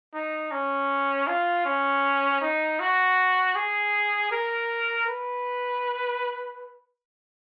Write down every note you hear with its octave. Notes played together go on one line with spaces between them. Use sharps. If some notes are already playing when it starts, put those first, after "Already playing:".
D#4
C#4
F4
C#4
D#4
F#4
G#4
A#4
B4